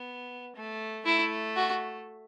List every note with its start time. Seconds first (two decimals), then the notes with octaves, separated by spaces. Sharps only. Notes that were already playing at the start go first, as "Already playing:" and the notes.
Already playing: B3
0.56 A3
1.05 A3 E4
1.56 F#4